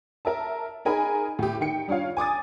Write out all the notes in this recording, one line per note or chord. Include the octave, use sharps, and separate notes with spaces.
A#4 E5 A5
D#4 G#4 A#4 G#5 B5
A2 G4
D#3 G5 C#7
G3 D4 F4 C#5 F5
G#5 D6 D#6 A6